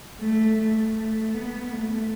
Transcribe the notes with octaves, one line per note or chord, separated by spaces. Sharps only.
A3
A3
B3
A3